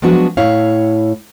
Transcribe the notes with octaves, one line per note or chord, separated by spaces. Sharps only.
F3 F#3 G#3 B3 D4 F#4
A2 E4 C#5 F5